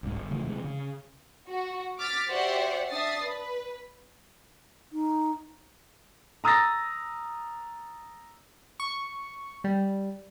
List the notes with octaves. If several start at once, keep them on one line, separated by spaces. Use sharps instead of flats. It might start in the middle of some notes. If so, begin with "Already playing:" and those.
C2 G#2
G1
C#3 E3 A3
C3 E3 F3 G#3
C#3
F#4
D6 F6 A6 B6
F#4 G4 C5 D5 E5 F#5
D4 E5 D#6 A6 C7
B4
D#4
A#5 D#6 E6 A6 A#6
C#6
G3